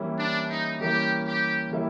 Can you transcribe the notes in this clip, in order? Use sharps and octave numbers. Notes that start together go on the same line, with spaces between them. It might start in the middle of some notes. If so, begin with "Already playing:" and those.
Already playing: E3 G3 A#3 C#4 E4
D4
D#4
E3 G3 A#3 C#4 E4 G4
G4
E3 G3 A#3 C#4 E4